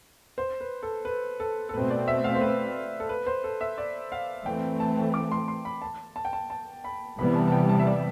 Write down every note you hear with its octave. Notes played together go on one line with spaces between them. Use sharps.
C5
B4
A4
B4
A4
A4
B2 A3 C4 B4
D5
E5
F5
C5
B4
A4
B4
C5
A4
E5
D5
F5
E3 A3 C4 G5
A5
D6
C6
C6
B5
A5
A5
G5
A5
A5
B5
C3 E3 G3 B3 B5
A5
A5
G5
A5
E5
D5